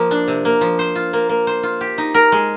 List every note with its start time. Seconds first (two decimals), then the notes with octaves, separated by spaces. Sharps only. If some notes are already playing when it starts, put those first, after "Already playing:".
Already playing: F3 A#3
0.11 D4
0.28 C3
0.45 A#3
0.61 F3
0.79 C5
0.95 F4
1.13 A#3
1.29 A#3
1.47 C5
1.63 F4
1.81 G4
1.98 D#4
2.14 A#4
2.32 G#3